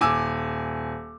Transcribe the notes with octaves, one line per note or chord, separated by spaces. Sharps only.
D#1 G#5 D6 E6